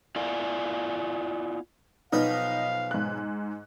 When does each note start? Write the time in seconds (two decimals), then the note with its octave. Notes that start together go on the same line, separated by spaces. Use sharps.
0.16 B3 E4 F4 D5 F5 G#5
2.13 B1 F3 D#4 B4 F5
2.91 G#2 F#6